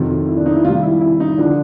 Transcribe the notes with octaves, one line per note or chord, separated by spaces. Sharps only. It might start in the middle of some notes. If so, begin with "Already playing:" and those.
Already playing: F2 C3 D#3 F#3
E4
D4
D#4
E4
C3 D#3 G3 F4
E4
E4
D#4
D3 F3 D4